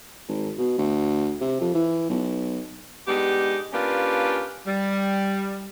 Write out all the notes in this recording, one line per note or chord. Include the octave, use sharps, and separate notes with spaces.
G#1
B2
D2
C3
F2
E3
B1
G#3 B3 D4 D#4 G4
A#3 C#4 D4 F4 G4 B4
G3